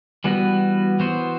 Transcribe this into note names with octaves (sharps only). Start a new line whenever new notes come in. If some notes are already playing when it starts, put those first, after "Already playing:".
E3 G3 B3 F#4 B4
E3 B3 F#4 C5